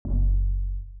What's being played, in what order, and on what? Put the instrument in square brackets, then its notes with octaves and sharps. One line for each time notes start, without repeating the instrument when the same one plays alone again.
[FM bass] F#1